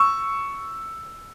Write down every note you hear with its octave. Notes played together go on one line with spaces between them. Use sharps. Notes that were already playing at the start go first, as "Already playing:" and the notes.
Already playing: C#6 E6